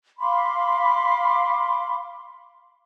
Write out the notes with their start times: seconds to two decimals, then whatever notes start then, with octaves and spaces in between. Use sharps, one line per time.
0.19 F5 B5 C6 D6